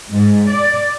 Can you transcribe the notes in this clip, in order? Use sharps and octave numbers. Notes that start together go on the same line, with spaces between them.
G#2
D5